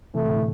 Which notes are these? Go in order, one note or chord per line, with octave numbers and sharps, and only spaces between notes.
C3 E3 A3
A2 D3
A2